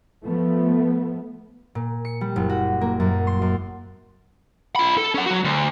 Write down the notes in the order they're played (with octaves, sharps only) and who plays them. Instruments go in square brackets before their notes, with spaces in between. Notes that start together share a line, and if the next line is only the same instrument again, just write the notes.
[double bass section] F3 A3 B3
[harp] A#2
C#7
G3
F#1
F#4
A#3
F#2
C6
F#2
[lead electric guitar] F4 B5
A4
C#4 F#5
F#3 F#4
D2